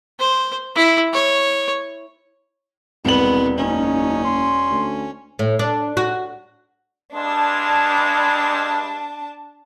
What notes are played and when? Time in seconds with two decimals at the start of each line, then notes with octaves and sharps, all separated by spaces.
0.19 C5
0.75 E4
1.13 C#5
3.05 E1 C2 G#3 B3 F#7
3.58 F#1 C#4 D#4
4.25 C6
4.70 D2
5.39 A2
5.59 D4
5.97 F#4
7.13 G2 G#3 D4 A5